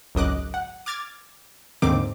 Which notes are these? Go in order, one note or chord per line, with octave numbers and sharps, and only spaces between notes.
G#1 C#2 F#2 D#5 D6 F#6
F#5
D6 F6 G#6 A6
D#2 G#2 D3 D#3 C4 D6